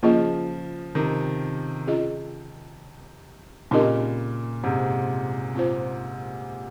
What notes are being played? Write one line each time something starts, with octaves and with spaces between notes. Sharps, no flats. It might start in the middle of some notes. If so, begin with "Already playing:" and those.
C#3 F3 A#3 F4 G#4 D#5
C3 D#3
C#4 F4 G#4 D#5
A#2 C#3 C4 D#4 G4 A#4 D#5
G#2 C3
C4 F4 C5